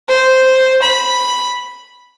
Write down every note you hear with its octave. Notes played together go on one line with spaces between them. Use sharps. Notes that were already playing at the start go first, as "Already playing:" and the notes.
C5
B5